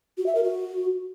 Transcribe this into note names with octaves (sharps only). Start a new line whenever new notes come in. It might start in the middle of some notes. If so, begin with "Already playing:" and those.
F#4
E5
A#4
F#4